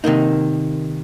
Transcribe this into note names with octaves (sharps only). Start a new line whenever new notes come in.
C3 D#3 A#3 D#4